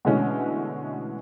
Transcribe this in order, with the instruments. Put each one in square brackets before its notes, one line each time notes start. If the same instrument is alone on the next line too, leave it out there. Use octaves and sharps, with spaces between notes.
[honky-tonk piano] B2 D3 E3 G#3 A3 C#4